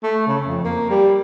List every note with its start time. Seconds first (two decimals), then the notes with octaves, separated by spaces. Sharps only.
0.03 A3
0.27 C#3
0.47 F2
0.65 A#3
0.89 G3